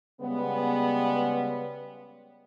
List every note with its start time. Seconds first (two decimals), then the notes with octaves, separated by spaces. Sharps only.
0.21 C#3 G3 G#3 B3